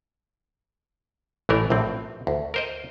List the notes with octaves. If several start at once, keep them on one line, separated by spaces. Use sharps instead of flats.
A1 E3 A3 A#4
A#1 A2 C4
D2
A#4 C5 D#5